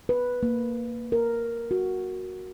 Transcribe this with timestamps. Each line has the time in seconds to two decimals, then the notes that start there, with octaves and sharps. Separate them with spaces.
0.09 B4
0.43 A#3
1.12 A#4
1.71 F#4